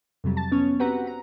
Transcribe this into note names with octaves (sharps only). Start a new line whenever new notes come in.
F2 C3 F#3 G3
A5 A6
B3 C#4 C#5
C4 F#4 G4 B4 F#5 A#5
A#5